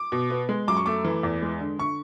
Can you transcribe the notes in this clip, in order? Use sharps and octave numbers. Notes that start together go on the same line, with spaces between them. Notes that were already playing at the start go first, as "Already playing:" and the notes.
Already playing: D6
B2
B3
G#3
F#2 D6
C#6
A3 D6
E3
E2
G#3
D3
D3 C#6